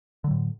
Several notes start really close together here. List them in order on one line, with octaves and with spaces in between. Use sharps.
D3 F#3 A2